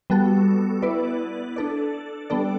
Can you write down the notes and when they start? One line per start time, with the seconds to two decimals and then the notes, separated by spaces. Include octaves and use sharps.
0.10 G3 B3 F#4 A4
0.82 B3 E4 B4 D5
1.56 D4 A4 D5
2.30 G3 B3 D4 A4 D5